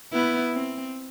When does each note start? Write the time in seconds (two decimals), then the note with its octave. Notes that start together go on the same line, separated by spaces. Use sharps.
0.13 B3 E4
0.53 C4